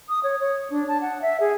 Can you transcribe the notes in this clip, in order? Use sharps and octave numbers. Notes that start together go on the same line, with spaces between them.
D#6
C#5
C#5
D4
A5
F#5
E5
G#4